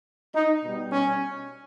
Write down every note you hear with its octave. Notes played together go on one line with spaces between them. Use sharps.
D#4
B2 G3
C#4